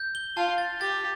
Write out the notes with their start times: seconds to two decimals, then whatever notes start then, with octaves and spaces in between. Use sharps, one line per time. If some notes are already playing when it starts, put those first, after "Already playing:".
Already playing: G6
0.15 G7
0.37 F4 A5
0.58 A6
0.80 G4 A6